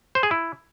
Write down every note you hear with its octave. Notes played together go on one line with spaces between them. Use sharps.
C5
G#4
E4